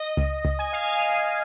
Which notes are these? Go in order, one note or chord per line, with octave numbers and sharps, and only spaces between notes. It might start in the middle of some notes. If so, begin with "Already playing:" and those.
Already playing: D#5
C#2
C#2
G#5
F5